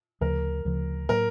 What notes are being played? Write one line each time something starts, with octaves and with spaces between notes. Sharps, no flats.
D2 C#3 F3 A#4
D2 C#3 F3
A2 F#3 A#3 A#4